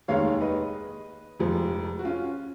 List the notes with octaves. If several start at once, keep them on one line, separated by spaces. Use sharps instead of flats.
F1 D#2 D#3 G#3 C#5 F5
B4 D#5
F1 F2 F3 G#3
F#4
C#4 F4